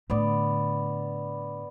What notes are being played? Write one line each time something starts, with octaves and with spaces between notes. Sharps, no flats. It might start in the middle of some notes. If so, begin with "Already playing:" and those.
A2 D3 B3 D5